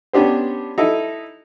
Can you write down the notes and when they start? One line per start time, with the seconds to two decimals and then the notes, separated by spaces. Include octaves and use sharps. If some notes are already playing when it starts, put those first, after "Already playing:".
0.13 B3 C#4 D4 G4 C5
0.78 D#4 E4 A4